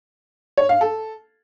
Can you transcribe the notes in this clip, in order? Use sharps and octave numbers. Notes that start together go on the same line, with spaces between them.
C#5
F5
A4